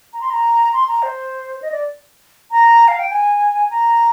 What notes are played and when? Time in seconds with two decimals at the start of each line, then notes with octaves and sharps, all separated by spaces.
0.13 A#5
0.21 C6
0.30 A#5
0.73 C6
0.88 A#5
1.03 C5
1.62 D#5
1.72 D5
2.51 A#5
2.88 F5
2.99 G5
3.11 G#5
3.71 A#5